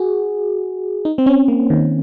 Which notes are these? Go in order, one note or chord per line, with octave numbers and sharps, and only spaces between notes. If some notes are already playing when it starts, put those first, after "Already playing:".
Already playing: F#4 G#4
D#4
C4
C#4
A#3
D#3